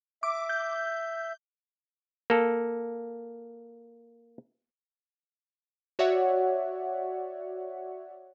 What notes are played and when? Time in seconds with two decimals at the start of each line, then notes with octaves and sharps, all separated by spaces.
0.23 E5 D6
0.49 G6
2.30 A#3 A4
5.99 F#4 C#5 D5 E5 F#5